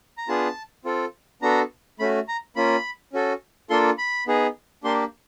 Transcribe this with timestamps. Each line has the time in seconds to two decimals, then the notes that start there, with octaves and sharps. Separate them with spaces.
0.18 A#5
0.28 B3 D4 F4 G#4 A5
0.85 C4 F4 A4
1.42 B3 D4 F#4 A4 A#5
1.99 A3 C#4 F#4 B5
2.28 A#5
2.56 A#3 C#4 F4 B5
3.13 C#4 F#4 A4
3.70 A#3 D4 F4 A4 C6
3.98 B5
4.27 B3 D#4 G#4
4.84 A#3 D4 G4 C6